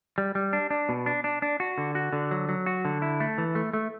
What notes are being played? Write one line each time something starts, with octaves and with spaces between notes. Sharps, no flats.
G3
G3
D4
D4
B2
D4
D4
D4
F#4
D3
F#4
D3
F#3
F#3
F#4
D3
E4
A3
E3
A3
A3